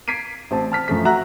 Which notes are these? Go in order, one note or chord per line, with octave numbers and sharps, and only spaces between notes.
G#6 B6 C7 D7 D#7
A1 C4 A5
A5 F6 B6
F#2 F3 A3 B6
F#4 E5 A#5 F#6